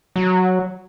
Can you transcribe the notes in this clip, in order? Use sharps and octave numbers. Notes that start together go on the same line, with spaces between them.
F#3